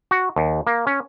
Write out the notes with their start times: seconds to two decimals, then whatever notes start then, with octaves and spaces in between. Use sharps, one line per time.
0.11 F#4
0.36 D#2
0.67 A#3
0.87 C#4